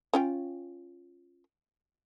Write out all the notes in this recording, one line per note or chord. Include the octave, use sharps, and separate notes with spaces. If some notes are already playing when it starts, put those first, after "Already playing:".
C#4 F4 G5